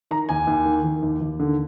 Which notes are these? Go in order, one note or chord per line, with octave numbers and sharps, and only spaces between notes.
D#3 A#5
D#2 G#5
D#2
D#3
D#3
D#2
D#2
D3